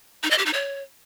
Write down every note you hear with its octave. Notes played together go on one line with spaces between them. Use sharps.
D#4
D#5
G4
D#4
C#5